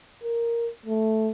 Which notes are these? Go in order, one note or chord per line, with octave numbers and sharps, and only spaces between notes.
A#4
A3